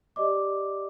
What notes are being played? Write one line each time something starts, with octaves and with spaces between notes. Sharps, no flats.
G4 D5 D#5 D6